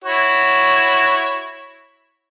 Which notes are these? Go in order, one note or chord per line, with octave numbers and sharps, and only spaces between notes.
E4 F#4 C#5